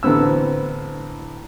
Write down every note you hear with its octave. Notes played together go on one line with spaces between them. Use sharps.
A1 D3 B3 C4 E6